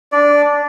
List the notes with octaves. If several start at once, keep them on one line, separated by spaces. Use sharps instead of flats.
D4 D5